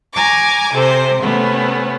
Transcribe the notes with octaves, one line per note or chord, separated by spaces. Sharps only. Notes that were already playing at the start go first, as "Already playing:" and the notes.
G#5 A#5 C#6 D6
C3 A4 C5
C3 A3 B3 C#4